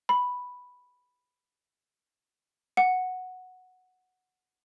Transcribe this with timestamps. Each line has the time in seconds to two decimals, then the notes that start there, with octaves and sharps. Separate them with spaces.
0.09 B5
2.77 F#5